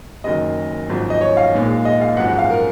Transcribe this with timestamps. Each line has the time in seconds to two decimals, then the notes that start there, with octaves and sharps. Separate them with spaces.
0.24 F#1 F#2 D#3 D#5
0.89 G#1 F#2 F3
1.10 D#5
1.21 C#5
1.37 F5
1.53 A#1 A#2 G#3 D#4
1.85 D#5
2.01 F5
2.17 G#1 F#2 F3 G#3 F#5
2.28 F#5
2.38 F5
2.50 A#4